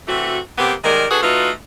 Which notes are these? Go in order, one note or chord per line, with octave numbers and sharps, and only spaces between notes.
C3 E3 A3 F#4
C3 A#3 B3 G4
D#3 G3 G#3 A#4
D4 F#4 G#4 A4 B4
A3 D#4 F4 F#4 B4